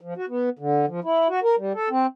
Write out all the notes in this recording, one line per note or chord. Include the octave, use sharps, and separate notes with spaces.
F3
F#4
B3
D3
F3
E4
F#4
A#4
G3
A4
C4